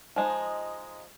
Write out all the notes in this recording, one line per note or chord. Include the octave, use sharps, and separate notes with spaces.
F3 G#3 D#4